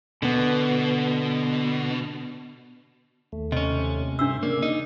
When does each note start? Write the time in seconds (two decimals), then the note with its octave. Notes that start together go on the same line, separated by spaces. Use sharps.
0.23 B2 D3 B3
3.32 D#2 A3
3.52 C3 C#4 D#5
4.19 G2 D4 E5 C6 E6
4.43 C#3 A#3 D5 G#6
4.62 D#4